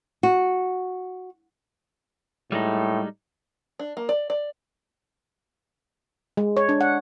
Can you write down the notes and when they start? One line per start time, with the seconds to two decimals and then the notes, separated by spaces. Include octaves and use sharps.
0.23 F#4
2.52 A2 G3 G#3 D#4
3.79 D4
3.97 A#3
4.09 D5
4.30 D5
6.37 G#3
6.57 C#5
6.69 D4
6.81 F#5